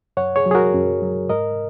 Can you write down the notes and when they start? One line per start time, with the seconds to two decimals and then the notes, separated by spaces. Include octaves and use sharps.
0.17 F#2 C#5 F#5
0.36 G#4 C#5
0.46 F#3
0.51 G#4
0.55 F#4 A#4
0.74 F#2
1.02 F#3
1.29 G#2 A#4 D#5